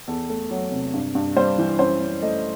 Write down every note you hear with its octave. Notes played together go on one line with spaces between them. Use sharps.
E2 A4
A3
F#3
C3
G2
G2
G3 C5
E3
F#2 C5
F#2
A3 D#5